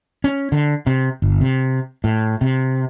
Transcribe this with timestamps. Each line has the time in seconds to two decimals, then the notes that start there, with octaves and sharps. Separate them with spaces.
0.24 C#4
0.52 D3
0.87 C3
1.22 G1
1.41 C3
2.04 A2
2.41 C3